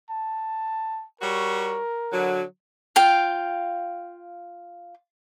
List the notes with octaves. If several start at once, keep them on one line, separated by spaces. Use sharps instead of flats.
A5
G3 F#4 A#4 C#5
D3 F#3
F4 F5 G5